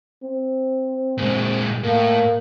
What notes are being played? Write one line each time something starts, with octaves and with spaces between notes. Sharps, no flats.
C4
A#2 G#3
A2 A#3